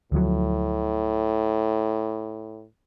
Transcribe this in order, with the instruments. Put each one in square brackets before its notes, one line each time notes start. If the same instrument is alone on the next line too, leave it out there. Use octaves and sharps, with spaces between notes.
[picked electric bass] D2 F3 F#3 [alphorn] A2